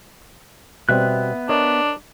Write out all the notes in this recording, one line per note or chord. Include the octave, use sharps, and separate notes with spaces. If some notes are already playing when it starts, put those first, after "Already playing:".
B2 G3 B3 C4 E5 F#6
D4 A#4 C#5 D#5